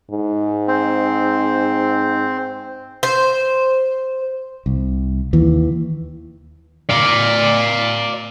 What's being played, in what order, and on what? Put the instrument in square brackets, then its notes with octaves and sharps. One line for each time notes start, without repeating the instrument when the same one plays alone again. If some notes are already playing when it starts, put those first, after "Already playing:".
[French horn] G#2
[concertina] C4
[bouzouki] C5
[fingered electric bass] C2
D#2 E3
[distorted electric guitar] D5 F5